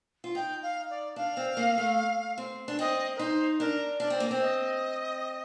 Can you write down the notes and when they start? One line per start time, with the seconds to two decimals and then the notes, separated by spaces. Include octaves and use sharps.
0.24 F4
0.35 D#4 G5
0.62 F5
0.90 D5
1.16 D4 F5
1.37 C4
1.57 A#3
1.78 A3
2.38 C4
2.68 D4
2.79 C4 D#5
3.15 A#4
3.19 D#4 C5
3.59 D4 A#4
4.00 D4 D5
4.10 C4
4.20 A#3
4.31 C4
4.40 D#5